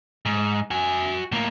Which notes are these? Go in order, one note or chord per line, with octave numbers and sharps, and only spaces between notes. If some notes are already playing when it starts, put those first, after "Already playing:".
G#2
F#4 G#5
A2 A#3